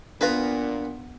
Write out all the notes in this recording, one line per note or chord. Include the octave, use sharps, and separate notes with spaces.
A#2 B3 D4 F4 A#4 B4